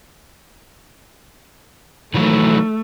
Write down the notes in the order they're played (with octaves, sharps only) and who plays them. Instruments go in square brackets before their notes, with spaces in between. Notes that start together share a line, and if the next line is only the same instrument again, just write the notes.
[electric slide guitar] D#3 E3 F#3 [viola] A3